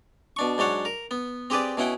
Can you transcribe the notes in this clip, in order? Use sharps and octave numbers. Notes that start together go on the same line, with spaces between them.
B2 D4 C#6
G#2 F#3 D4 C#5 F#5
A#4
B3
C4 G4 G#4 B4 D5
B2 C#4 E4 F#5 G5